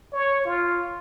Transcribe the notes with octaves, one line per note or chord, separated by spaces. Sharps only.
C#5
F4